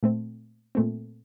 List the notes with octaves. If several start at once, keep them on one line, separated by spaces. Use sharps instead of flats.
A#2 A3 C4
A#2 A3 C4